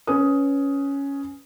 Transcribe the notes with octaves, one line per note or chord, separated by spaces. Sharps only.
C#4 B4 D#6